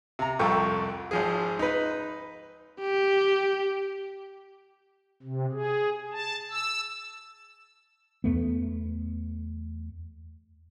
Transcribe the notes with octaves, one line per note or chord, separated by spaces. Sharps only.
C3 A#5
C2 F2 F4 A4 G5 C#6
G#1 F3 G#4
D#4 B4
G4
C3
G#4
A5
E6
E2 A3 B3